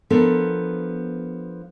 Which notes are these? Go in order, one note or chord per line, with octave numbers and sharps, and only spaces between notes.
F3 B3 D4 A4 A#4